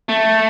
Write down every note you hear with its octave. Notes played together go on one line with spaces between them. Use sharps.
A3